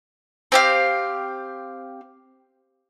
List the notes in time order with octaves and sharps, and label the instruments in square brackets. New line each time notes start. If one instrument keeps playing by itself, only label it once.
[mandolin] C4 G4 F5